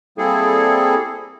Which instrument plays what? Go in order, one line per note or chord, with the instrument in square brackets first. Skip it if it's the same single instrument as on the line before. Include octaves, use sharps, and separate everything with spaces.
[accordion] G3 A#3 C4 E4 G#4 A4